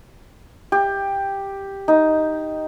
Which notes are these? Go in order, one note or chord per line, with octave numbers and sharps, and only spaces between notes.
G4
D#4